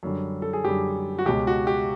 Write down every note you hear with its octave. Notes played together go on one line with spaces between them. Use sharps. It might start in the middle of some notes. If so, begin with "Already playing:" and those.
F#2 D3 G3
A4
G#4
F#2 D3 G3 G4
F#4
C#2 B2 G#3 G4
F#4
G4